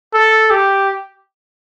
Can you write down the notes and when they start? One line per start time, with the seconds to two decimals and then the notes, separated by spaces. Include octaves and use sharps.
0.14 A4
0.50 G4